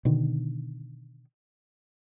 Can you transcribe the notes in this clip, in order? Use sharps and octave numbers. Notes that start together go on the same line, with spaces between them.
B2 D3 D#3